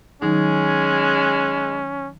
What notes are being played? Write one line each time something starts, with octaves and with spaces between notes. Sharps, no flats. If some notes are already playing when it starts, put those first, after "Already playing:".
D#3 F#3 G#3 C#4 D#4